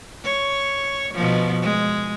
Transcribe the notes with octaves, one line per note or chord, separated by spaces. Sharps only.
C#5
B2 F3
G#3